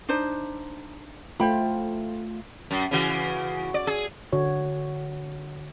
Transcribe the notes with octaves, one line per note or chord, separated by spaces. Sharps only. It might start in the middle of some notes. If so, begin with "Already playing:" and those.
D4 D#4 C5
A3 F4 C5 G5 B5
F#2
C#3 E3 F#4
D5
G#4
D3 F#4 C#5